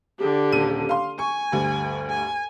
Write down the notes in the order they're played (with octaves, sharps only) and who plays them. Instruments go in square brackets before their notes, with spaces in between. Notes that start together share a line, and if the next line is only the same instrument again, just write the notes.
[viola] D3 G4
[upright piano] D#1 D#7
F5 C6
[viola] G#5 [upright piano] C#6
[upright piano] D2 G2
[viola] G#5